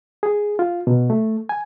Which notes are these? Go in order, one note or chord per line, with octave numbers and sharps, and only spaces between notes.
G#4
F4
B2
A3
G#5